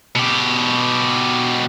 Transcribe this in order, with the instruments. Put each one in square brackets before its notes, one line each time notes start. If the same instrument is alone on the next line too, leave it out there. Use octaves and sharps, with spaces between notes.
[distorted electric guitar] B2 G4